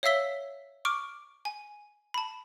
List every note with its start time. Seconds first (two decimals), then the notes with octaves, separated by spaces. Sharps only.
0.03 C#5 E5 F5 E6 B6 G7
0.85 C#6 D6 F6 D7
1.45 G#5
2.14 A5 B5